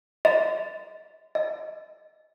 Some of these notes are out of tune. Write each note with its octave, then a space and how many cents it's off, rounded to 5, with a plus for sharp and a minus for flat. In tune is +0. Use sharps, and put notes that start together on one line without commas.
D#5 +25
D#5 +10